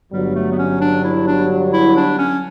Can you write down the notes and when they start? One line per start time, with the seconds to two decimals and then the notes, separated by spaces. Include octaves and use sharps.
0.12 G1 G2 F#3 G3
0.35 A3
0.52 B3
0.58 C#4
0.81 D4
1.04 E4
1.27 D4
1.73 E4
1.96 D4
2.19 C#4